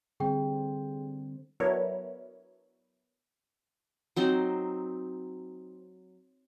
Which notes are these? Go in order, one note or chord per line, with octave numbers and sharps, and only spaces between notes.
D3 G3 C4 G#4 G5
F#3 B3 D4 E4 A#4 C#5
F#3 C4 D#4 C5